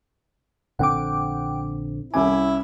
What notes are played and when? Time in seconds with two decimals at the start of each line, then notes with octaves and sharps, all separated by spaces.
0.79 A#1 D3 C4 F#5 G5 D6
2.14 C2 C#4 E4 G#5 D6